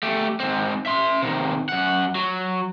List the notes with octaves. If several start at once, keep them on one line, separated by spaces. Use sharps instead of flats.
A3 G4
G#2 C4
E5 C6
C3 D#3
F#2 F#5
F#3